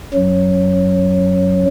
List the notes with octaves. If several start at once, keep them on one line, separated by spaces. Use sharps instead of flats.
F#2 F#3